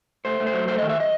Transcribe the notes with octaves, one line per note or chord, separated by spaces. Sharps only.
A3 C5
A3
C5
F#3
A3 C5
D#3 D#5
E5
D#5